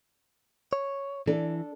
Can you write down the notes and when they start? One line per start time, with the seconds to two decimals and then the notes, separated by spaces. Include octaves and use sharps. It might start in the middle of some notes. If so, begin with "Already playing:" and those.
0.73 C#5
1.27 E3 D4 A4